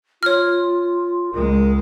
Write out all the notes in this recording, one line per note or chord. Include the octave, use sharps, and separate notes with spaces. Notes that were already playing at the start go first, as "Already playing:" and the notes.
F4 C#5 F6
C#2 G#3 A#4